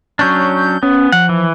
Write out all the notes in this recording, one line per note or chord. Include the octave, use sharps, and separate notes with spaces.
F#3 C#4 D4 G6
B3 C#4
F3 F#5
E3